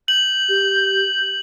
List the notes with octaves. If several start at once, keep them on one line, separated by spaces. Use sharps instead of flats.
G6 F#7
G4